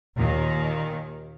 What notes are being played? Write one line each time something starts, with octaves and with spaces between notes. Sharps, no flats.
D#2 A#2 D#3